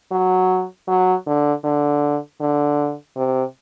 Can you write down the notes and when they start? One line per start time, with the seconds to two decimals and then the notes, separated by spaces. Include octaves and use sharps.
0.11 F#3
0.88 F#3
1.27 D3
1.64 D3
2.41 D3
3.16 C3